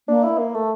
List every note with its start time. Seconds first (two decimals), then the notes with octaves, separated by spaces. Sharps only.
0.08 A#3 D4
0.23 E4
0.38 A#3
0.54 A3